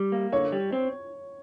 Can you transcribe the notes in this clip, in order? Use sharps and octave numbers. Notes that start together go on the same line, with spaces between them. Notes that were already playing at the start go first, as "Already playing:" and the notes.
Already playing: G3
A#3
D3 C#5
G3
C4